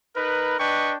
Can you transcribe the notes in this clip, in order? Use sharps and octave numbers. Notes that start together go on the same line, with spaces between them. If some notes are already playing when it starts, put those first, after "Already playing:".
D#4 A#4 B4
D4 B4 D#5 G5 C#6